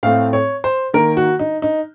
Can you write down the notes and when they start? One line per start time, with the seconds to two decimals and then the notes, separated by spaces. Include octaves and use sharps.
0.03 A2 A3 C4 F5
0.33 C#5
0.64 C5
0.94 D#3 A#3 A#4
1.17 F#4
1.39 D#4
1.62 D#4